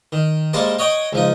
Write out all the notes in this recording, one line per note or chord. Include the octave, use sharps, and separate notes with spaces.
D#3
G3 G#3 A#3 C5 A5
C#5 D#5 F#5 G5 C#6
C#2 F3 D#4